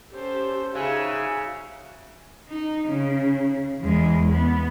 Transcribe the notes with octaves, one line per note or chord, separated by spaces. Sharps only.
C#4 G4 A4 C5
C#3 D#4 F#4 E5 F5 G#5 E6 F#6
D#4
C#3
E2 G#3
B3